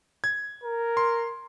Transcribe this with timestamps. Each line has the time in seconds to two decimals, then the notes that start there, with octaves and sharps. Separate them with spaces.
0.24 G#6
0.64 A#4
0.97 C6